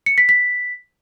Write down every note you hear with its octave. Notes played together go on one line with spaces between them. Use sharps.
C#7
B6
B6